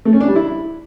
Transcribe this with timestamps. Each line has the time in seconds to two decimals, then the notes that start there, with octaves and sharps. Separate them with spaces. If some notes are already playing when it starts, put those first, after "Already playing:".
0.05 A3
0.13 C#4
0.20 D4
0.28 G3
0.36 E4